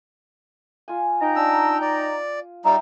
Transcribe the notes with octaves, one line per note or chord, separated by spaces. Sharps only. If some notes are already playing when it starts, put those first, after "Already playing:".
F4 G#5
D#4 G5 A#5
D4 E6
D5
G3 D#4 E5 G5 A#5